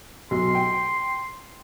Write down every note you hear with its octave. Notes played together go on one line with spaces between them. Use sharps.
B1 C6
G5